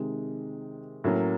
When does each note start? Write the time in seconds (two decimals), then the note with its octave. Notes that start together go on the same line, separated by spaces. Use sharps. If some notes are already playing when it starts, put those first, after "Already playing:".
Already playing: C3 D#3 G#3
1.04 A2 F#3 A#3 C#4